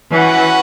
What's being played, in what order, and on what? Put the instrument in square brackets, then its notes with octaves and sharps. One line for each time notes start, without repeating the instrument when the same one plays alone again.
[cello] E3 [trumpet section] C#4 F#4 B4 F#5